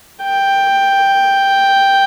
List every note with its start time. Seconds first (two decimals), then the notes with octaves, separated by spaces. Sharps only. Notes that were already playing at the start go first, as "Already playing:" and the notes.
0.23 G5